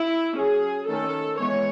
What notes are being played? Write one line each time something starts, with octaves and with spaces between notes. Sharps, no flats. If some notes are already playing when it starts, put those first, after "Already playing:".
Already playing: E4
F#3 C#4 G#4
D#3 A3 C#4 A4
E3 G#3 B3 C#5